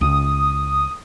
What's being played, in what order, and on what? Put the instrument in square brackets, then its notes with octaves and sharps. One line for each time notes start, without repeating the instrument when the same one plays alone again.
[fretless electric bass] C#2 [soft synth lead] D#6